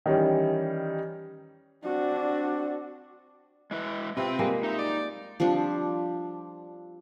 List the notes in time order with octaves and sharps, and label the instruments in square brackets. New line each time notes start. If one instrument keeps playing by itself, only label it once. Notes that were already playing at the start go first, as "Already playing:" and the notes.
[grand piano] D#3 E3 G3 C#4
[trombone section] C4 D4 [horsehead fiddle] F#4
[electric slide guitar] G#3 E4 B4
[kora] C3 F4 [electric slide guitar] C4 G5 [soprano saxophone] B4
[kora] G3 G#3 A#3
[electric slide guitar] D#4 [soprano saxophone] E5
[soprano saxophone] D5
[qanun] F3 G3 C4 D4